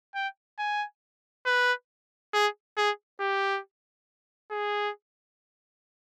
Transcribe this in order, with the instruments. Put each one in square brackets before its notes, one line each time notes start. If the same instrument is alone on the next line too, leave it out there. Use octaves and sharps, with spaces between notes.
[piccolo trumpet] G5
G#5
B4
G#4
G#4
G4
G#4